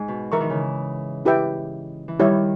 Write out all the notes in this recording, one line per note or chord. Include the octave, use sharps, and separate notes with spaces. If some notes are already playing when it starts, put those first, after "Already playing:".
Already playing: G#2
B2
E3 A#4 E5 A#5 C#6
D#3
C#3 E3
E4 G4 B4 E5 G5
E3
D#3 G3 E4 G4 C#5 E5